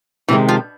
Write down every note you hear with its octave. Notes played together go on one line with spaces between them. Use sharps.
C3 D#3 E3 G#3
F3